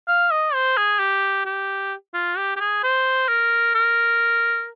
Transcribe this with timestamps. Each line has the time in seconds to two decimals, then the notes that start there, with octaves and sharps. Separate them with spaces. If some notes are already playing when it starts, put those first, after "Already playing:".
0.08 F5
0.31 D#5
0.54 C5
0.77 G#4
0.99 G4
1.45 G4
2.14 F4
2.37 G4
2.56 G4
2.60 G#4
2.83 C5
3.28 A#4
3.75 A#4